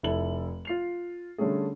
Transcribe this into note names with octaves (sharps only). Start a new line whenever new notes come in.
F1 E4 A4 F#7
F4 C7 F7
D3 G3 A3 C#4 G#4